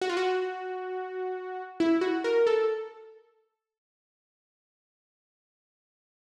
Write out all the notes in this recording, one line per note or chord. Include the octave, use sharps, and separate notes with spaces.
F#4
F4
F#4
E4
F#4
A#4
A4